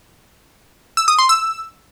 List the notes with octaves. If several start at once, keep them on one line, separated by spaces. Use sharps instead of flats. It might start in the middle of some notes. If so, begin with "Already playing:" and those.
E6
D#6
C6
E6